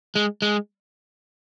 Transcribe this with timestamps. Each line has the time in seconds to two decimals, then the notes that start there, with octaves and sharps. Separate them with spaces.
0.15 G#3
0.42 G#3